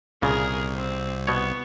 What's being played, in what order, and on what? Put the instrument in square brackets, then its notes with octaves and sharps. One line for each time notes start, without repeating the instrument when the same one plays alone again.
[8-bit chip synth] C2 [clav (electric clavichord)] A#2 C#3 [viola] G#4 A#4
[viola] C4
[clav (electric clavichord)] B2 C#5 [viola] B3 C#6